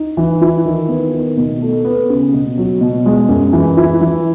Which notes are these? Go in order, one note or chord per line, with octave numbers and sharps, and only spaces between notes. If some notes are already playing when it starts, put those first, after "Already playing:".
Already playing: D#4
E3
E4
D#3
B3
D#3
B2
A3
B3
C#3
B2
F#3
B2
G#3
F#2
E3
E4
E3